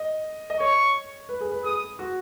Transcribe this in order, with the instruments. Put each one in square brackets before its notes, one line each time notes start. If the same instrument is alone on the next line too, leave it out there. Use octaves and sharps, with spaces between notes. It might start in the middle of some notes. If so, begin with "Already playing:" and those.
Already playing: [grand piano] D#5
D#5
[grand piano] C#5 [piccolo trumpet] C#6
[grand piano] B4
G#4
B4
[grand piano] G#4 [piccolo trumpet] D#6
[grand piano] F#4